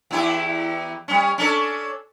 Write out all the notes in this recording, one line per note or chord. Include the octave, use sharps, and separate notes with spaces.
E2 E4 G4
G3 C#4
C#4 D4 A4